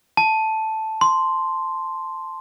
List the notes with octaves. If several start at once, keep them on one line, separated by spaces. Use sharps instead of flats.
A5
C6